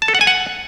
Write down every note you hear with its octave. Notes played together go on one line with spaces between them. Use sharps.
A5
A4
F#5
G#5
F#5